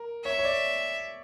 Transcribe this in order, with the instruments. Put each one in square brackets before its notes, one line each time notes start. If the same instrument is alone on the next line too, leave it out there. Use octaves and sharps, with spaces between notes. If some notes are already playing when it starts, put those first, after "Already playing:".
Already playing: [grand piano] A#4
[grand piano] C#5 [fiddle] E5
[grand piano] C#5
D5